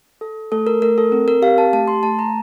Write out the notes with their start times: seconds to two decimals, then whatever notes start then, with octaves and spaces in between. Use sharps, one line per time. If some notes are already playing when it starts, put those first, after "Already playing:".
0.21 A4
0.52 A3 A4
0.67 A#4
0.82 A3 A#4
0.98 A4
1.12 C4 A#4
1.28 A#4
1.42 G4 F5
1.58 A5
1.73 A3 A5
1.88 C6
2.03 A3 A5
2.19 A#5